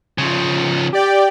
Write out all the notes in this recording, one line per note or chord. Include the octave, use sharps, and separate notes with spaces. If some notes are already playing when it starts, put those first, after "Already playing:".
C#3 F3
G4 D5 G5